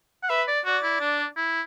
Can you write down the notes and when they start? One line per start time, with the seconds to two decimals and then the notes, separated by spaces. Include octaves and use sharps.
0.23 F#5
0.30 B4 E5
0.48 D5
0.65 F#4 D5
0.83 E4
1.00 D4
1.37 E4